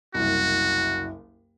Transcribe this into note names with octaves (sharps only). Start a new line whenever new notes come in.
F#1 C2 F#4